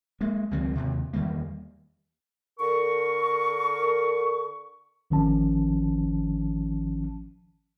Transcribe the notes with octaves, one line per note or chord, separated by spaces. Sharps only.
G#3 A#3
C#2 D#3 F#3 C4
D#2 C3
E2 D#3 G3 A#3
D3 A#4 C#6
G#1 D#3 F3 C#4 A5